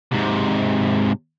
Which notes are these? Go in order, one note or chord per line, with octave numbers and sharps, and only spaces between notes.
G#2 C3